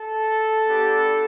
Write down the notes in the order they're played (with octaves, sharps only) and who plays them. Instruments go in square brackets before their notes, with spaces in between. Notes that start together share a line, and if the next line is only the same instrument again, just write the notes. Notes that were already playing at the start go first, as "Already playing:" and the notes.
Already playing: [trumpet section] A4
B3 D4 G4